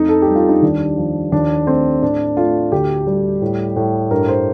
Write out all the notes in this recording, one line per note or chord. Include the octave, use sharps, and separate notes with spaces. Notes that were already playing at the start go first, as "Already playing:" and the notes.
Already playing: F2 A3 D#4
A4
G4
G3
F4
D#4
D#2 D4
F3
D#2 D4
A3 C4
A2 D4
A3 F4
D2 G4
G3
A2
A2
G2 A#4
C5